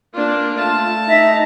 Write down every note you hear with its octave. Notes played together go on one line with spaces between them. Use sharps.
A#3 D4 F4
A3 A5
D#4 E5 A#5